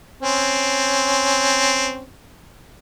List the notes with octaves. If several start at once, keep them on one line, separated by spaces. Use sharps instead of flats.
C4 C#4